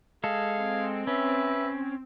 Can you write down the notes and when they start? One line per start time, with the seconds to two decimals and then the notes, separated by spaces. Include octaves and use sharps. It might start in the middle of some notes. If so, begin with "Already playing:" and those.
0.24 G#3 G#4 A4 F5
0.59 C4
1.07 C#4 B4 E5